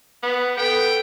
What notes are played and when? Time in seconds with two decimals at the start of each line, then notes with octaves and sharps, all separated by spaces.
0.23 B3
0.57 B3 A4 G5